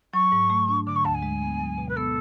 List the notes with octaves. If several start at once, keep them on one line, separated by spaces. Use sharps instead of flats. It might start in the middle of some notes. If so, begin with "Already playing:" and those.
F#3 C#6
G#2
A3
D4
D3 D6
C#6
D2 A5
G#5
G#3
B3
F#3
B2
B4
B3 A4